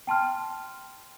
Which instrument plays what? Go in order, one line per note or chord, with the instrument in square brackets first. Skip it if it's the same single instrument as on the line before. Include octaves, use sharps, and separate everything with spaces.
[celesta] G5 A5 C6 F6